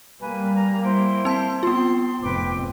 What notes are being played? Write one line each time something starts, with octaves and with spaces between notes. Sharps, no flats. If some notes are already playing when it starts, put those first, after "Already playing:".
G3 A#3 B4 G#5
A#5
E4 C5 G5
C4 A5
B3 C4 F4 C6
F1 G#2 C4 B4 G5 D6